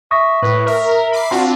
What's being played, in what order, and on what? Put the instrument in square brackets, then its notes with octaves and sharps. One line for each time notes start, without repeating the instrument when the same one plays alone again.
[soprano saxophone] E5 [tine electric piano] C#6 D#6 A#6
[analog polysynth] A2 [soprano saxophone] B4
[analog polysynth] A#4 [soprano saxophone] E5
[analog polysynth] B5 D6 C7
[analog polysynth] C4 D4 F4 [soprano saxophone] F#4 [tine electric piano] C6